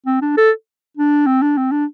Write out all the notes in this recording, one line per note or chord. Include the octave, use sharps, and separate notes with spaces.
C4
D4
A4
D4
C4
D4
C4
D4